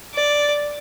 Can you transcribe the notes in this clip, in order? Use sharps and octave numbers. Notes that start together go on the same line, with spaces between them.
D5